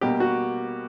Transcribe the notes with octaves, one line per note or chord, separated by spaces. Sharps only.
B2 G3 A#3 G4
F#4